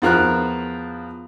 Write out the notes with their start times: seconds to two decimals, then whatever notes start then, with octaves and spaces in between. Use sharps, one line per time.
0.02 E2 F3 A#4 F#6